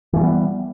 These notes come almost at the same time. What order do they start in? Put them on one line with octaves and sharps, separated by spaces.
E3 A3 G3 B3